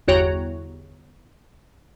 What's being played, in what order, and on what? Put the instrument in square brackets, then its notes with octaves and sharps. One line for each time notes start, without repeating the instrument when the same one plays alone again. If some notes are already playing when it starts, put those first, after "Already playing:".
[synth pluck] G1 E2 F#4 C#5 G5 A#5